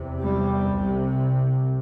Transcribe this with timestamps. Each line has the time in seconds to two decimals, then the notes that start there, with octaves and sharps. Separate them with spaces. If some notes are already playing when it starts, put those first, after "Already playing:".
Already playing: E2 C3
0.22 G3
0.71 C2 C3